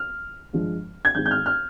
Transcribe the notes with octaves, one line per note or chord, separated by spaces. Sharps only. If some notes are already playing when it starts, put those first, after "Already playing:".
Already playing: F6
G2 F3 G#3
G#6
G#1 G#2 D#3 G#3 G6
G6
F6
F6